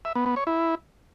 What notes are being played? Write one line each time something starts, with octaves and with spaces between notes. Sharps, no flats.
E5
B3
B3
C#5
E4